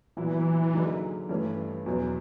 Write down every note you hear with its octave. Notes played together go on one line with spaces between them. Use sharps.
A#2 E3 F#3 B3 E4
D3 F#3 A#3 D#4 G#4
G2 E3 A3 C#4
E2 B2 F#3